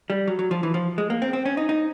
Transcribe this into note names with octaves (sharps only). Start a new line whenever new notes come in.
G3
F#3
F#3
F3
E3
F3
G#3
A#3
C4
C4
C#4
D#4
D#4